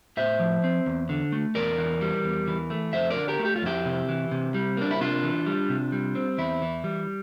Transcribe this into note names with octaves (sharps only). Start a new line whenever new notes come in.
A2 C5 E5
F3
C4
E2
D3
A3
E2 A#4 D5
E3
G3
E2
E3
A3
F2 C5 E5
A#4 D5
D3
G4 A#4
A3
G4
F4
F2 E4 G4
C3
E3
C3
G3
A#3 D4
E4
C3 D4 F4
E3
G3
C3
G3
C4
E2 E4
E3
G3